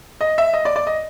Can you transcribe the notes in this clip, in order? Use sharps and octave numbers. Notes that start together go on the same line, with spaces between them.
D#5
E5
D#5
D5
D5
D#5